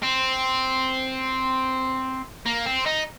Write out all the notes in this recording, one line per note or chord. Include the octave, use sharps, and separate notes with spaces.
C4
A#3
C4
D#4